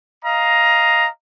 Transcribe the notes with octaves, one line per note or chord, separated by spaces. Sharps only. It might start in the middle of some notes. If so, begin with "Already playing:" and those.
D#5 F5 A#5